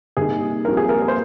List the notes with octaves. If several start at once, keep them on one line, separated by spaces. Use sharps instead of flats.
C3 G3 A#3 D#4 G4 G#4
A#1 A#2 G3 C4 G4 A#4
G#4
A#4
A#4
C5